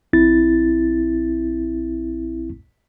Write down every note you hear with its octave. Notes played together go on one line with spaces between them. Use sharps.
A#1 C4 E4 A6